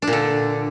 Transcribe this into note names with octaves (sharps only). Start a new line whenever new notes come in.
D4
A#2
D3